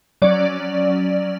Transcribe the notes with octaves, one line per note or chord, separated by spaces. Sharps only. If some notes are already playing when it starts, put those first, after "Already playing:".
F#3 C#4 D5